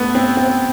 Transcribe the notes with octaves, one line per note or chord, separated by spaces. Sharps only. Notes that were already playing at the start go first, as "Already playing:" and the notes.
Already playing: A3 B3
C4
C4